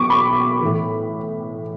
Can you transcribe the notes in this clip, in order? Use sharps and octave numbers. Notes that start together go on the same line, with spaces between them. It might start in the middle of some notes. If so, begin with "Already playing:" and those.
Already playing: B2 F#3 C#6 D6
B5
A2 E3